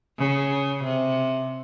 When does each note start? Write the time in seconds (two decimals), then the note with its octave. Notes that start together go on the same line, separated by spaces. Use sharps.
0.18 C#3
0.84 C3